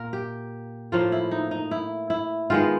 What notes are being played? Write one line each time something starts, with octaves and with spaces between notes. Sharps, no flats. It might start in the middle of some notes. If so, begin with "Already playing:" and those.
Already playing: A#2 A#3 A#4
G4
A2 F3 A#3 F4
E4
D#4
D#4
E4
E4
D#3 G#3 B3 F4